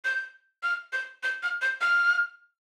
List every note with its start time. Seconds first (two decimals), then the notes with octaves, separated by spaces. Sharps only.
0.05 G6
0.63 F6
0.93 G6
1.23 G6
1.43 F6
1.62 G6
1.81 F6